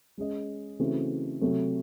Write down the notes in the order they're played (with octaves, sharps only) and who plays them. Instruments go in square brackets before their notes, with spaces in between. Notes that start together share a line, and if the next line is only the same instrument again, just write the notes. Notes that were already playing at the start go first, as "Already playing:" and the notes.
[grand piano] G#3 C#4 G#4 D#5
C#3 E3 A3 C4 F#4
C3 F#3 A3